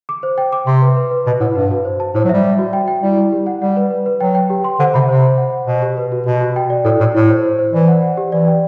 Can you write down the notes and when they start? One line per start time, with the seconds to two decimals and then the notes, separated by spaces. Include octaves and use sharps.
0.09 D6
0.23 C5
0.38 G5
0.52 D6
0.67 C3 C6
0.82 B4
0.97 B4
1.11 B4
1.26 B2 B4
1.40 A2 F#5
1.55 G2 B4
1.71 F#4
1.85 C5
2.00 A5
2.15 A2 C5
2.24 F#3
2.29 G3 E5
2.44 E5
2.59 F#4
2.73 G5
2.88 G5
3.03 G3 E4
3.17 E4
3.32 G4
3.47 F#5
3.61 G3 F#5
3.77 B4
3.91 B4
4.06 B4
4.20 F#3 G5
4.35 G5
4.50 G4
4.64 C6
4.79 D3 C5
4.94 C3 B5
5.09 C3 C5
5.23 C5
5.38 F#5
5.53 F#5
5.67 B2 C5
5.82 G4
5.97 B4
6.12 F#4
6.26 B2 F#4
6.41 F#4
6.56 G5
6.70 D5
6.85 A2 A4
7.00 A2 E4
7.14 A2 E4
7.29 C5
7.45 C5
7.59 C5
7.73 E3 D5
7.88 F#5
8.03 F#5
8.17 G4
8.32 E3 D5
8.47 G5